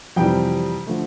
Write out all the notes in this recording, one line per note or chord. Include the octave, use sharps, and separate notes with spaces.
F2 C3 E3 G3 G5
D3 F3 A3